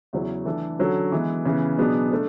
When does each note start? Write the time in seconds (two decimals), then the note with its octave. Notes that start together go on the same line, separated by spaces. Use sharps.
0.13 E2 C#3 F#3 C#4 E4
0.45 E3 A3 D4 A4
0.79 D3 F#3 C#4 F#4 A4
1.12 E3 G#3 B3
1.45 C#3 E3 B3
1.78 B2 F#3 B3 D4 G#4
2.11 A3 D4